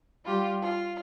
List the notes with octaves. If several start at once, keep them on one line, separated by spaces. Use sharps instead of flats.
G3 F4 G4
F4